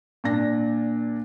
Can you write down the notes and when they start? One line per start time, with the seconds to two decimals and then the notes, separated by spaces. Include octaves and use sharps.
0.24 A#2 D4 A#6